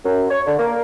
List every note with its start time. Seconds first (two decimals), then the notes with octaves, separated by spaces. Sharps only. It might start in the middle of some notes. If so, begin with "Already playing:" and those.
0.05 F#2
0.30 C#5
0.46 D3
0.59 A#3